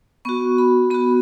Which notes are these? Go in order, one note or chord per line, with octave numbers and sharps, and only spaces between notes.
B3 F#4 C#6
B5
B3 F#4 B5